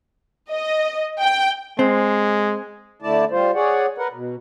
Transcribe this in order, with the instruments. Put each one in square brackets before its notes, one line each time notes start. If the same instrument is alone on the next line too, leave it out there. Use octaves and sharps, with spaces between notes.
[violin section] D#5
G5
[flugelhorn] G#3 [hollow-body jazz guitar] C4
[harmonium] D3 A3 E4 D5 A5
G3 F4 C5
G#4 C#5 D5 F#5
A#4 B4 F#5
B2